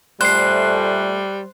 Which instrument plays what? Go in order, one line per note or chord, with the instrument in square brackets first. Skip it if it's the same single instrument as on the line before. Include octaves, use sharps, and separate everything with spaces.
[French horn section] A#2 A3 [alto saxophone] G3 [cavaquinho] C5 [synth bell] F#6 C7